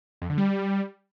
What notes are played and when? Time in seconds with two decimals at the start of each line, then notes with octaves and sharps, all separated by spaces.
0.22 F2
0.30 D3
0.38 G3